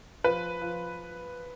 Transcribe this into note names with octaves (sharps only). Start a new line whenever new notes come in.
F3 B4
F3